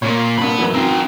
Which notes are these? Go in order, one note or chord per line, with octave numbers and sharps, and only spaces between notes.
A#2 A#3 C#5
G2 A#2 B3 B5
F#2 E3
C4 D#4